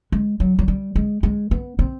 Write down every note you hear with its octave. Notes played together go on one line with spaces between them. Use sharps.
G#3
F#3
F#3
G3
G#3
G#3
B3
C4